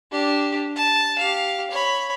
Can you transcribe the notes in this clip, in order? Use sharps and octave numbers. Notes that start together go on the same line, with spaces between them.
D4 G4
A5
G4 F5
C#5 B5